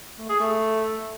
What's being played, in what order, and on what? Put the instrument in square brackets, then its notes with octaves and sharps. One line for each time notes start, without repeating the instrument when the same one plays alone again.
[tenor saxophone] A3
G#4
A3